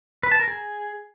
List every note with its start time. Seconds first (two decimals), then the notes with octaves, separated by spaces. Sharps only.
0.23 B4
0.32 A5
0.40 A#4
0.48 G#4